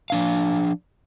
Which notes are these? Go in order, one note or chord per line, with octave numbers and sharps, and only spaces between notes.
F3 D4 F5